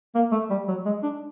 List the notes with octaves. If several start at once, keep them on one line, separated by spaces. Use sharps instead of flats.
A#3
A3
G3
F#3
G#3
D4